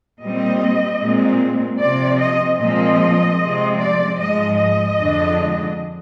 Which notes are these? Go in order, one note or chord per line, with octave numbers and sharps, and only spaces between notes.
A#2 G3 C4 D#5
A#2 G#3 C4
C3 F3 C4 D5
D#5
A#2 F3 G#3 C4 D#5
C3 F3 G#3 C4
D5
G#2 F3 G#3 D#5
D#5
F2 D3 G#3 D4